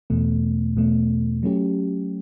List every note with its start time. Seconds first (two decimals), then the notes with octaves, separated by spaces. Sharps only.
0.10 E2 B2 A3
0.77 E2 B2 A3
1.43 F#3 A3 C#4 G4